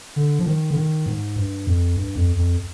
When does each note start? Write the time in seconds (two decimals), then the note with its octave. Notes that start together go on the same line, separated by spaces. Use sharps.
0.16 D3
0.39 F3
0.46 D#3
0.71 D3
0.76 D#3
1.06 G#2
1.36 G2
1.67 F2
1.96 G2
2.16 F2
2.36 F2